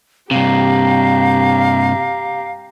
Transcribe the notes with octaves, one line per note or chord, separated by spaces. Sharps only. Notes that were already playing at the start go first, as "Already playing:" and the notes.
G2 C3 G4 F5 A#5